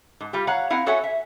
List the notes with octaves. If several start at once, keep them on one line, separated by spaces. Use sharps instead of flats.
G#2
G3 F4 G4
C#5 F5 F#5 A#5
C4 E4 F5 F#5
F#4 A4 C#5 E5 F#5 G#5
E5